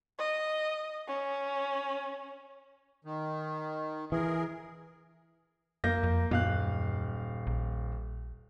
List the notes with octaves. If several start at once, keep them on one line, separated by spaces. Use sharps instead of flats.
D#5
C#4
D#3
E3 G#4 A#4
F#2 A#3 G6 A#6
F2
D#1 F#2 F5 F#6
A#1